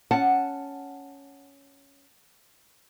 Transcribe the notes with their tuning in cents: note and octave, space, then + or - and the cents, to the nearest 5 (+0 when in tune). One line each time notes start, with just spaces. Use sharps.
C#4 +5 F#5 +0 A5 +0